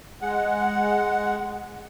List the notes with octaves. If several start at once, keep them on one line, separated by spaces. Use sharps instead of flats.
G#3 F#5